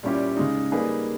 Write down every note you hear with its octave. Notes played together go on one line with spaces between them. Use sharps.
A#2 G3 C#4 E4 G4
C#3 G#3 D#4
G3 A#3 D#4 G#4 B4